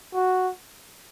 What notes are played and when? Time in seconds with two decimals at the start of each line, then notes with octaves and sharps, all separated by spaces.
0.14 F#4